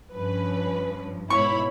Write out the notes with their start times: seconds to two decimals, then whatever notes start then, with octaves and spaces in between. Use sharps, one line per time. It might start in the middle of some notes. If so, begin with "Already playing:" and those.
0.13 G2 F3 C#4 B4
1.30 G#2 B2 E4 C#5 B5 C#6